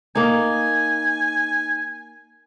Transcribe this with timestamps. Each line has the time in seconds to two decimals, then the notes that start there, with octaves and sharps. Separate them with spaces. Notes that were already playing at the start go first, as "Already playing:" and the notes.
0.15 A#3 D#4 G#5